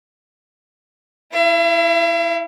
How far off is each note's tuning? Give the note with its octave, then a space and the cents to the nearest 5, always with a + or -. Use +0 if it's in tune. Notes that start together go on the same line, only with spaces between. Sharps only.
E4 +0 E5 +45